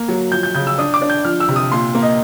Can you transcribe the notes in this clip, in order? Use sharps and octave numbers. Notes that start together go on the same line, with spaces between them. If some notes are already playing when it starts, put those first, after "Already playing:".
Already playing: A#3
F#3
F3 G6
G6
C#3 G6
E6
D4 D#6
D6
D4
G6
F3 F6
E6
C3
D#6
A#2 C6
A#3
D#5